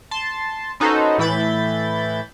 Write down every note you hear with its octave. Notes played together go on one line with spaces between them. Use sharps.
A5 C6
C#4 D#4 F#4 A4 B4 C5
A2 E3 E4 B5 G6 A6